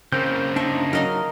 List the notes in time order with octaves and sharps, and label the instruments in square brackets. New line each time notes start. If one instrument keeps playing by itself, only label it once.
[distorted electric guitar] C#3 A#3 [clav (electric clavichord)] C4 [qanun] A#4 [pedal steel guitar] G6
[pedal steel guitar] D4 D#4 [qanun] E5 G5 C#6
[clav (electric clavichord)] F#3 [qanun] A#4 D#5 F5